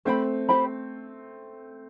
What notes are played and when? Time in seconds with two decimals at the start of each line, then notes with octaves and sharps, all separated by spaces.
0.05 A3 C4 G4 C5 G5 B5
0.49 G4 C5 G5 B5